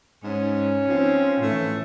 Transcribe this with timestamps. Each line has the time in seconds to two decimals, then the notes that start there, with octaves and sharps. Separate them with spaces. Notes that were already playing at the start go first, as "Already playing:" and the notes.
0.24 G#2 C#4
0.88 F3 C4 D#4
1.42 A2 E3 A3